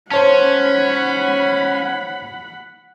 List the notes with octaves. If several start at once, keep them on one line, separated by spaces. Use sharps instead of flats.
C#4 C5 C#5 F#5 A5 B5